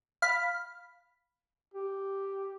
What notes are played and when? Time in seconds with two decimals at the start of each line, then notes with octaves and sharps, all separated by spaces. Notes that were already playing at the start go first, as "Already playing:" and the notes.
0.22 F5 B5
1.74 G4